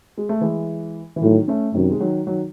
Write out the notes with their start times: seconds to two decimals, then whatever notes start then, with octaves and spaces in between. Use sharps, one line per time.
0.18 G#3
0.29 A3
0.41 E3 G#3
1.16 E3
1.22 A2 D#3 F#3
1.48 A3 C#4
1.74 F#2 C3 D#3
1.91 G#3
2.00 D#3 F#3
2.27 D#3 F#3